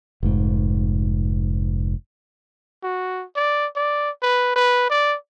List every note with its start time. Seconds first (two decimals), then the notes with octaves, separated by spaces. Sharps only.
0.23 F1 G#2
2.83 F#4
3.36 D5
3.76 D5
4.22 B4
4.56 B4
4.90 D5